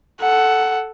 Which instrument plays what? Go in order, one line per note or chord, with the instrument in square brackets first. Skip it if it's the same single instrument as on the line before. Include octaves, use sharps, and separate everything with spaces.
[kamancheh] A4 F#5